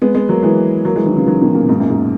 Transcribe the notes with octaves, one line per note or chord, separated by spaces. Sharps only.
G#3 B3
G#3 B3
F#3 A#3
E3 G#3
F#3 A#3
E3 G#3
D#3 F#3
C#3 E3
D#3 F#3
B2 D#3
A#2 C#3
G#2 B2
F#2 A#2
G#2